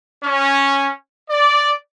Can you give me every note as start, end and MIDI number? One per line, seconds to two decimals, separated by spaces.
0.23 0.90 61
1.30 1.72 74